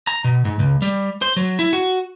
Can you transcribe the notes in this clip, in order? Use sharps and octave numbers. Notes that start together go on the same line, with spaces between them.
A#5
B2
G#2
C#2
G3
C5
F#3
E4
F#4